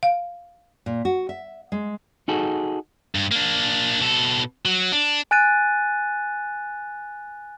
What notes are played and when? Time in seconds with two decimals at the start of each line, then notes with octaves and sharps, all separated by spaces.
0.03 F5
0.86 A#2
1.05 F#4
1.29 E5
1.72 G#3
2.28 D#4 F#4 G#4 A4
3.15 G2
3.32 A#3 D4
4.00 B2 A4
4.65 F#3
4.92 D4
5.31 G#5 F#6 A6 D#7